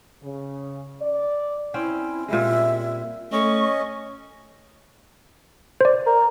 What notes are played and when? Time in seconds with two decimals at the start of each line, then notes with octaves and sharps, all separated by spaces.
0.23 C#3
1.02 D5
1.74 C4 C#4 E4 G5
2.28 A#2 G3 G#3 E5
3.32 A3 C#4 D#5 C#6
5.81 C5 D5
6.06 A#4